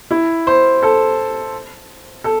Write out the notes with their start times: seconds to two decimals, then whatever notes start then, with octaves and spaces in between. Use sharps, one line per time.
0.11 E4
0.47 C5
0.83 A4
2.24 A4